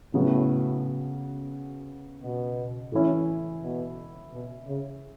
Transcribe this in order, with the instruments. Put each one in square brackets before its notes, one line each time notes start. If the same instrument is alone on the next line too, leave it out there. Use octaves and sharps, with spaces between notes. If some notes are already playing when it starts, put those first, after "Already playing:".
[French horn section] A2 [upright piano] C#3 F#3 B3 F#4
[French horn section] B2
[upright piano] A2 E3 C#4 E4
[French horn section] B2
B2
C#3